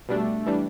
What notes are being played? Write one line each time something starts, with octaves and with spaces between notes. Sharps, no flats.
B2 G3 A3 D4
E3 G3 D4